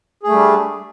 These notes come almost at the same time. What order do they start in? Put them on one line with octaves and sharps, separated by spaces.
G#4 A3 G3 D4